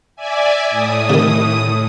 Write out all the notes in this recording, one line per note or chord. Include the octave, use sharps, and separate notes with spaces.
D5 E5 G#5
A2 D#6
C3 D#3